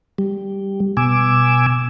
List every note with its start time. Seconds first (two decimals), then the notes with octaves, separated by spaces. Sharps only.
0.18 G3
0.97 B2 G#5 D6 E6